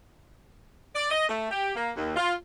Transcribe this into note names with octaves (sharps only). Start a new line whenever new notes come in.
D5
D#5
A3
G4
A#3
D#2
F4